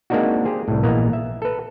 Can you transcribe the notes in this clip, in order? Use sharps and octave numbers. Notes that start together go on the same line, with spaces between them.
G#3 A#3 C4 D4 D#4 F#4
G4 G#4 C5
C2 A2
A#1 E3 A#3 B3 D#5 A#5
E5
A4 B4